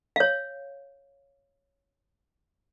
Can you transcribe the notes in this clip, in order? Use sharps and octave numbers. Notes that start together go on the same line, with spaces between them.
C#5 F5